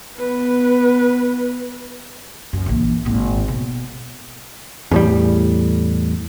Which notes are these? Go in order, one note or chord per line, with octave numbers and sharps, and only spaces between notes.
B3 B4
F#2
A#1 E3
G#1 A#2
B2
E2 A2 G3